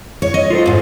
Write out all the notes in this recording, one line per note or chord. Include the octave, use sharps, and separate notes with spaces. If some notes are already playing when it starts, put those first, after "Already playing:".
C#5
D#5
F4 A4 C5
D2 G#2